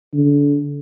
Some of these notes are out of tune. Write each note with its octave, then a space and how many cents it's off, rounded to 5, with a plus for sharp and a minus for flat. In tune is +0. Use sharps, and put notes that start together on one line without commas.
D3 -30